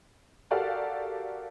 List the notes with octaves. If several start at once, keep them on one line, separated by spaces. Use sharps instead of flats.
F#4 G4 A4 A#4 D5 F5